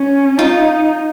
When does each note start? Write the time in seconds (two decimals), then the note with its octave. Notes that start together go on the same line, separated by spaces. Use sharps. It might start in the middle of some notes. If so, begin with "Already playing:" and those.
Already playing: C#4
0.38 D#4 F4